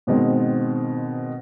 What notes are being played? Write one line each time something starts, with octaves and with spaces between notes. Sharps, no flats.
G#2 B2 D#3 G#3 C4